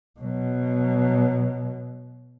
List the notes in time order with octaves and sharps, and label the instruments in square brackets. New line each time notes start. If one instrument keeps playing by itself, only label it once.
[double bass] B2 F#3